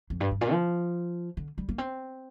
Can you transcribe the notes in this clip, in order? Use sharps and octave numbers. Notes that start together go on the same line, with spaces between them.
F2
G2
G2
A#2
F3
D3
G3
A#3
C4